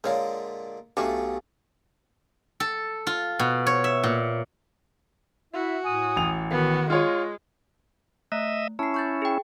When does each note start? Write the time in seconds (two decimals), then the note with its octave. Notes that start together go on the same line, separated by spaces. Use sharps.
0.04 A#2 D3 G#3 C5 C#5 F5
0.97 B1 A3 D4 F#4 G4 F5 G#5 C#6
2.60 A4
3.07 F4
3.39 B2
3.67 C#5
3.84 E5
4.03 A#2
5.53 E4 F#4 E5
5.84 A2 G#5 D#6
6.16 A1 F7
6.51 D#3 B3 F#4
6.90 G#3 F4 C#5
8.32 A3 D#5 E5
8.79 C#4 E4 A5 C7
8.94 C#6 G6 A6
9.22 G#4 G5